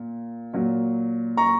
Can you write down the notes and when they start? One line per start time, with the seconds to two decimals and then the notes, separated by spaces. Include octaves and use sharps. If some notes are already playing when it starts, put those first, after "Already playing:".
Already playing: A#2
0.53 A#2 F#3
1.37 A#5 C#6